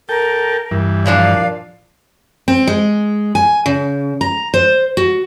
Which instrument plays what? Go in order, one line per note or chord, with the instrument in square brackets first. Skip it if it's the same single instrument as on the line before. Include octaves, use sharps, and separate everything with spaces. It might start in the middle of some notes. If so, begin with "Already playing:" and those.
[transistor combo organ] A4 G5 [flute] A#4
[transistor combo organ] G2 E3
[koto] A#2 F3 D4 [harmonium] D5 [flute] F5
[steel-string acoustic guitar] C4
G#3
G#5
C#3
A#5
C5
F#4